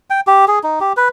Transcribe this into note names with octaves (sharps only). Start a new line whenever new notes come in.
G5
G4
G#4
D#4
G4
B4